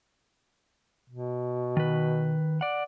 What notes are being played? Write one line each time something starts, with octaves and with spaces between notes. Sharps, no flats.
B2
D#3 B4
D5 F#5